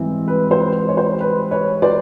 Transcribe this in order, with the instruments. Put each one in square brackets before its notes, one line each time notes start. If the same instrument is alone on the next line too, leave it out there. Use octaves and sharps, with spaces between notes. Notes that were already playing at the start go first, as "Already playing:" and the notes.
Already playing: [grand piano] G#2 E3 G3 C4
[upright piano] B4
C5
C#5
C5
B4
B4 C#5
C5 D5